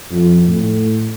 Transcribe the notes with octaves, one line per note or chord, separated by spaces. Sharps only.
F2
A2